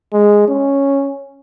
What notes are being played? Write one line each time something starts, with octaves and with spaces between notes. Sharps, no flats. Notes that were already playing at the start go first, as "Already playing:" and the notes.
G#3
C#4